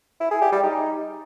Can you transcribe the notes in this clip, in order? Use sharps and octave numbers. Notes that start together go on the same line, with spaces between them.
E4
G#4
G4
G3
D#4